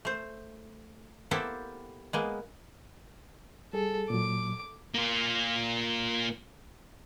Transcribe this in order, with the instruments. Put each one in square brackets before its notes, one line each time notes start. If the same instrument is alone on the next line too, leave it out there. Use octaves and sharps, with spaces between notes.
[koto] A3 C5
A#3 B3 E4 G4 A4 C5
G#3 A#3 B3
[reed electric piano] G3 G#4 [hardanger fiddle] A4
[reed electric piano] A#2 F#3 [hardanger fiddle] D6
[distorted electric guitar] A#3 F4